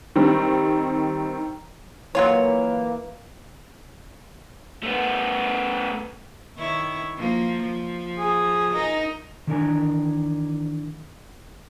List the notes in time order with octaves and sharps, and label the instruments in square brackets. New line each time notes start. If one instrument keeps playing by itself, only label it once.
[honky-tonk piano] D#3 G3 C4
[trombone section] E3 A#3 [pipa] F#3 F4 C#5
[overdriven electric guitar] A3 B3
[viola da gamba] D#3 E4 C#5
F3 A#3
F3
[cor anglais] G#4
[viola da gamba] D#4 A#4
[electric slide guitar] D#3 E3 D4 A#4 E5 G#5